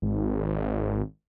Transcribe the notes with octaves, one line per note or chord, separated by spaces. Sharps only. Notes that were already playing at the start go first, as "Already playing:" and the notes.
G#1